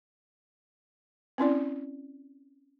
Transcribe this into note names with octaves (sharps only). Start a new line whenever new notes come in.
C4 C#4 E4 D5